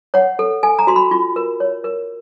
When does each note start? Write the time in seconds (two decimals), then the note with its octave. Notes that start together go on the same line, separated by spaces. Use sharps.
0.14 C#5 F#5
0.39 A4
0.63 A4 G#5
0.79 A#5
0.87 F#4 C6
0.96 B5
1.11 F4
1.36 A#4
1.60 C#5
1.84 A#4